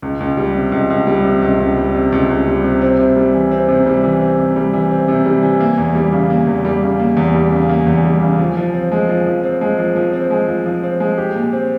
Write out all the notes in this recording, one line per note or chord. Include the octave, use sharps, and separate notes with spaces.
C#2
C#2
G3
C3
C#2
C#2
G3
C3
C#2
C#2
G3
C3
C#2
C#2
G3
C3
C4
C3
G3
E3
C4
C3
G3
E3
C4
C3
G3
E3
C4
C3
G3
E3
A#3
E2
G3
C#3
A#3
E2
G3
C#3
A#3
E2
G3
C#3
A#3
E2
G3
C#3
F3
F3
C4
G#3
F3
F3
C4
G#3
F3
F3
C4
G#3
F3
F3
C4
G#3
G4
A#2
C4